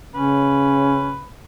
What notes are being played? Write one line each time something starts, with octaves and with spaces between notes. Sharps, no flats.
C#3 C#4 B4